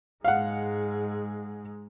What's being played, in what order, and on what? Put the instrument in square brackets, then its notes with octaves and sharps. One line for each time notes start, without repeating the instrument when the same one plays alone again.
[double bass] G#2 G#3 [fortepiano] F5 F#5